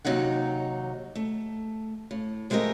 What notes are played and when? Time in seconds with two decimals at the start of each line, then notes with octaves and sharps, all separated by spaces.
0.05 D#2 C3 F#3 D#4 F#5
1.15 A3
2.11 A2
2.50 F3 G#3 A3 G4 A#4 D#5